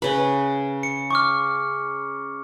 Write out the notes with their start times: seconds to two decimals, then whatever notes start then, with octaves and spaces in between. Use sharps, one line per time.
0.02 C#3 B4
0.83 C#7
1.11 C#6 D6 F6